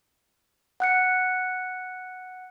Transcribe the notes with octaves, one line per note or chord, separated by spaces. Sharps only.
F#5 F#6 C#7